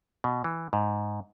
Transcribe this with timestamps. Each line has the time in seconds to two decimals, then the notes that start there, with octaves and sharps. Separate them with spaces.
0.24 B2
0.44 E3
0.73 G#2